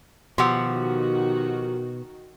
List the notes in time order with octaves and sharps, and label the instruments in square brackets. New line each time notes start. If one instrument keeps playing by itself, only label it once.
[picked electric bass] B2 [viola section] D#3 F#4 [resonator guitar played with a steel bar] F3 G4 F#5 [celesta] C6 E6